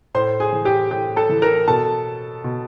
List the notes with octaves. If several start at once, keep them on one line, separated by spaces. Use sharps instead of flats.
A2 C5 C6
G#4 G#5
E3
G4 G5
A2 G4 G5
A4 A5
E3
A#4 A#5
B2 A4 A5
B2